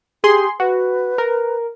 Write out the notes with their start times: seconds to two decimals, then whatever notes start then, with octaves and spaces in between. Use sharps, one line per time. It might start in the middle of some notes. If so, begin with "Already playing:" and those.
0.24 G4 G#4 C6
0.60 F#4 B4
1.18 A#4